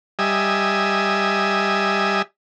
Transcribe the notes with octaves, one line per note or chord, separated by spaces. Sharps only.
G3 D#5 E5 G#5